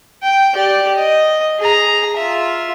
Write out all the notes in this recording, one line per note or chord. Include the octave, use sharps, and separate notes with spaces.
G5
G4 D5
D#5
G#4 A#5
F4 E5